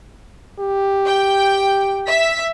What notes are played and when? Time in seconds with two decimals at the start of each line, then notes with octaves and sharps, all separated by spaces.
0.60 G4
1.06 G5
2.08 E5 B6